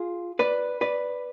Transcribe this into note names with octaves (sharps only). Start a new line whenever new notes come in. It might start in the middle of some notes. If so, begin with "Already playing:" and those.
Already playing: F4 G#4
B4 D5
B4 D5